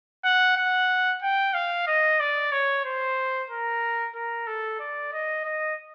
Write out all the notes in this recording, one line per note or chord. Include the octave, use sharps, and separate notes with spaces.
F#5
F#5
G5
F5
D#5
D5
C#5
C5
A#4
A#4
A4
D5
D#5
D#5